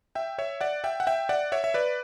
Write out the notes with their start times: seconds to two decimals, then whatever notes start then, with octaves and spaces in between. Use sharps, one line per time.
0.15 E5 G5
0.38 C#5 E5
0.61 D5 F#5
0.84 E5 G5
1.00 F#5
1.07 E5 G5
1.29 D5 F#5
1.52 C#5 E5
1.64 E5
1.74 B4 D5